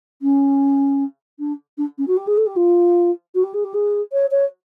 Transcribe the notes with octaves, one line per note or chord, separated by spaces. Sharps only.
C#4
D4
D4
C#4
F#4
G4
G#4
A4
G4
F4
F#4
G4
G#4
G4
G#4
C#5
C#5